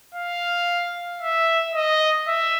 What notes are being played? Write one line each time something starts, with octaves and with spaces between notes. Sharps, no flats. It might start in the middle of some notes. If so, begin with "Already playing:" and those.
F5
E5
D#5
E5